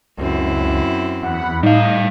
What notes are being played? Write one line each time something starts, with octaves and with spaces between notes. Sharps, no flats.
C#2 F#2 C4 E4
E2 F#5 B5
A2 G3 D#4 D#5 F5